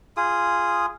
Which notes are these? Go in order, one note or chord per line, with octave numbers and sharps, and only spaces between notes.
F4 G#4 D#6